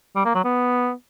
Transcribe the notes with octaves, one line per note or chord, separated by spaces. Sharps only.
G3
A#3
F#3
B3